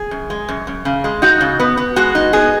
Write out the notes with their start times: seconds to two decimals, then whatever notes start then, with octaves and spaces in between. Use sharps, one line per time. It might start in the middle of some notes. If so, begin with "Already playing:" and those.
Already playing: G#4
0.11 F#2
0.30 G#3
0.49 F#2
0.67 F#2
0.85 C#3
1.04 G#3
1.22 D#4 F#4
1.41 C#3
1.60 B3
1.77 B3
1.96 G#3 F#4
2.15 D#4
2.33 B3 G#4